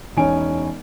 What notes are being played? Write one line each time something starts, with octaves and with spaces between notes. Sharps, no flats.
E1 C#4 D#4 G#5 D7